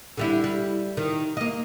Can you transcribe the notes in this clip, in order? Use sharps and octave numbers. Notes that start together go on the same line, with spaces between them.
D3 G3 E4
G3
D#3
A#3 D#5